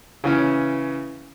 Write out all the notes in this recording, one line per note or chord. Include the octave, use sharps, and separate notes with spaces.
C#3 E3 C#4